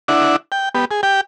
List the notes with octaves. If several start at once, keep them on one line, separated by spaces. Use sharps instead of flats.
D4 E4 F#5
G5
B3 G4
G#4
G4 G5